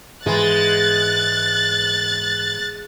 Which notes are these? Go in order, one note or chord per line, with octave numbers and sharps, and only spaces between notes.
G#2 E3 G#3 F#6 A6